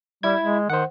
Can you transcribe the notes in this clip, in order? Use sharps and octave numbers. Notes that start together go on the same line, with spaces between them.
G3 E4 G#6
G#3
D#3 C5 F#5